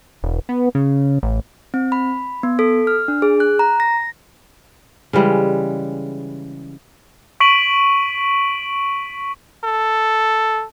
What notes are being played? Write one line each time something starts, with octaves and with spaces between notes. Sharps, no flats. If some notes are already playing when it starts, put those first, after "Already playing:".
E1
B3
C#3
A1
C4
B5
B3
A4
F6
D4
G#4
F#6
A#5
A#6
C#3 E3 G3 G#3
C#6 B6 D7 D#7 F#7
A4